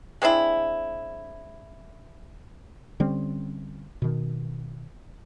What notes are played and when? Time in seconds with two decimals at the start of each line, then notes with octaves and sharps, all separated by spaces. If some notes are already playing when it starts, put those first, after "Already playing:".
0.22 G#3 C4 D4 E4
3.00 D3 G3 C4 C#4
4.02 B2 D#3